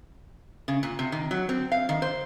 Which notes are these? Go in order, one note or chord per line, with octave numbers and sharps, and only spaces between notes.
C#3
A#2
C3
D#3
F#3
C4
F5
D#3
C5